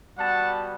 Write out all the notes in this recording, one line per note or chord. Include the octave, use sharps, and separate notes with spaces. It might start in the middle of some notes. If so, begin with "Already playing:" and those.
G3 B3 F#4 F#5 A5